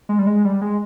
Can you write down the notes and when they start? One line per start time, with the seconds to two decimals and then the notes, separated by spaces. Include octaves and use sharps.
0.09 G#3
0.19 G3
0.27 G#3
0.45 G3
0.61 G#3